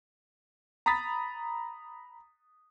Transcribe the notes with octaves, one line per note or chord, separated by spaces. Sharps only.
A#5 B5 D#6 A6 B6